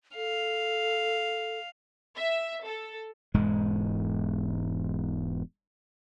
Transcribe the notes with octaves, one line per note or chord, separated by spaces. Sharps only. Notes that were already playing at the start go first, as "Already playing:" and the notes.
A4 F5
E5
A4
E1 G#2 G#3